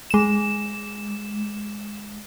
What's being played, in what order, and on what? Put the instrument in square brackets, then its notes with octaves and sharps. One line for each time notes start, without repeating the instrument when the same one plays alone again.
[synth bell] G#3 E7